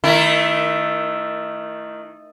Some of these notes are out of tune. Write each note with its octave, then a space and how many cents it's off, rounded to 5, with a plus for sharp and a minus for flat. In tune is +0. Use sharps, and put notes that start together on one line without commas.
D#3 -10 A3 +0 E4 +20